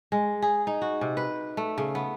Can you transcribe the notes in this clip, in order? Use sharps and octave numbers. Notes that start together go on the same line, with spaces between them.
G#3
G#4
D#4
F#4
C3
B4
A3
C#3
B3